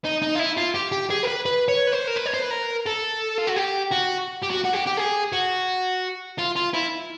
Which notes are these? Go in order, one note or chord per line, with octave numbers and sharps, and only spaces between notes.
D#4
D#4
F4
E4
F4
G4
G4
G#4
A#4
B4
B4
C#5
B4
C5
A#4
B4
C#5
C5
B4
A#4
A4
F4
F#4
G4
F#4
G4
F#4
F#4
G4
G4
G#4
F#4
F4
F4
E4